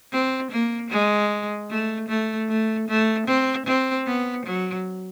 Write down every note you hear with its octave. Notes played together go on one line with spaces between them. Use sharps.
C4
A#3
G#3
A3
A3
A3
A3
C4
C4
B3
F#3